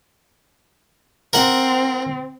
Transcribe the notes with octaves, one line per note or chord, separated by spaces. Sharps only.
C4 A#4 F#5